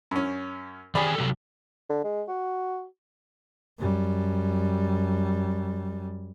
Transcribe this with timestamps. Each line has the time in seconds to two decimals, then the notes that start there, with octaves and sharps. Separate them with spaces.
0.11 F#2 C#4
0.95 D#3 G4 G#4 D5 G#5 B5
1.15 C3 F#3 A4
1.90 D3
2.04 G#3
2.28 F#4
3.79 F#2 G3